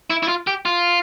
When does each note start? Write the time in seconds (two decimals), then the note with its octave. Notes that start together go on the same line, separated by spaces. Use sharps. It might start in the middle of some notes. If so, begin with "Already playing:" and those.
0.10 E4
0.23 E4
0.28 F4
0.47 G4
0.65 F4